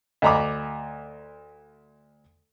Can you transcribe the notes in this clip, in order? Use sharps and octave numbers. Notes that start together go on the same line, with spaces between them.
D2 D#5 A#5 B5 D6